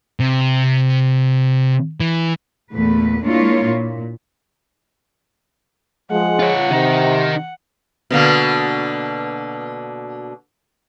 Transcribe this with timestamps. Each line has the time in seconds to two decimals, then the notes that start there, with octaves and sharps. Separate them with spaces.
0.20 C3
2.00 E3
2.73 E2 A#2 A3 B4
3.23 G#3 A#3 D4 E4 F4 C#5
3.66 A#2
6.11 F3 G#3 F#5
6.39 F4 C#5
6.71 C3 D#3 D#4
8.10 B2 D3 A#3